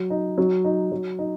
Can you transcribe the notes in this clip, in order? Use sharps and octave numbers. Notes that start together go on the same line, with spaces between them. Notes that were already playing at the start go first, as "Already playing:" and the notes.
Already playing: F#3
D#4
F#3
D#4
F#3
D#4